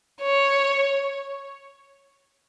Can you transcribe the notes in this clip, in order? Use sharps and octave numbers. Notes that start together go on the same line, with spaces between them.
C#5